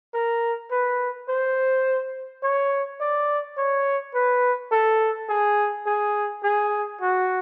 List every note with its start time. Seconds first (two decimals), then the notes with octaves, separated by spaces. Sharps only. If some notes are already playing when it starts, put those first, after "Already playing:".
0.14 A#4
0.71 B4
1.29 C5
2.43 C#5
3.00 D5
3.57 C#5
4.15 B4
4.72 A4
5.29 G#4
5.86 G#4
6.43 G#4
7.01 F#4